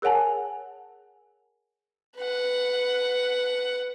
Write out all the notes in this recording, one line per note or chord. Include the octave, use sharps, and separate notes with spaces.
G#4 A#4 C#5 F#5 G#5 A5
B4 F#5